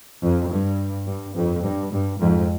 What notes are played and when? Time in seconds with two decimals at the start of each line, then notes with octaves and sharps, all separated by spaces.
0.22 F2
0.50 G2
1.06 G2
1.35 F2
1.63 G2
1.92 G2
2.21 F2 G#2